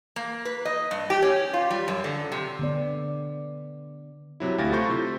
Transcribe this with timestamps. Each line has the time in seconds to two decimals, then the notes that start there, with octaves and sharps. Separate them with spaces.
0.16 A#3
0.45 B4
0.65 D#5
0.91 G2
1.10 G4
1.22 C#4
1.54 F4
1.70 G3
1.88 F#2
2.04 D3
2.32 C3
2.59 D3 B3 D5
4.40 C3 F#3 E4
4.58 D2 E4 G4 F5 A6 A#6
4.72 A3 E4 F4 C5 C#6 G6
4.90 C3